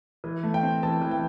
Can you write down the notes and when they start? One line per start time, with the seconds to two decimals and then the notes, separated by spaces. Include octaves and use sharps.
0.24 E3
0.43 A3
0.54 G5
0.63 C4
0.83 E3 A5
1.02 E3
1.11 G5